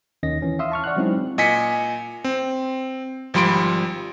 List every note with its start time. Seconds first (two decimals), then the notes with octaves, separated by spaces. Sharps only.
0.23 D#2 D#3 C#4 D#5 A#6
0.42 E3 C#4
0.59 E5 F5 C6 D#6 E6
0.72 A5 C#6 F6
0.84 D5 F#5 F#6
0.96 F#3 G#3 C4 C#4 D#4 E4
1.38 A#2 D#5 G#5 B6 C#7
2.24 C4
3.34 G#1 F3 G3 B5 C6 D7